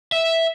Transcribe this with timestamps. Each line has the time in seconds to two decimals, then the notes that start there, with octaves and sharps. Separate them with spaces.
0.12 E5